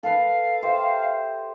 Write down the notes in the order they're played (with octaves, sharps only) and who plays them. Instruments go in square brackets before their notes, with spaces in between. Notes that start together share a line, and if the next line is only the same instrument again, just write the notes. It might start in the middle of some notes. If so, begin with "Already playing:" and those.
[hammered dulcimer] A4 B4 [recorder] F5
[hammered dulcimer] G4 C5 E5